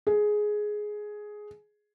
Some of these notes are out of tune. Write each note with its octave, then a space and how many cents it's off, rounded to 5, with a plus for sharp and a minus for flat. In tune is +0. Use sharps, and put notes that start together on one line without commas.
G#4 +10